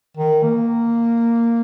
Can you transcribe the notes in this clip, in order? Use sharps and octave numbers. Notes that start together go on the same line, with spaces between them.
D#3
A#3